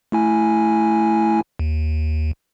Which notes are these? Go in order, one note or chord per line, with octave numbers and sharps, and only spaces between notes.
A3 E4 G#5
D#2